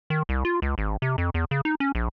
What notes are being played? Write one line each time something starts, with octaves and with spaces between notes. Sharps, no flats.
D#3
C2
F4
C#2
G#1
C3
F2
E2
C#3
D#4
C#4
A#1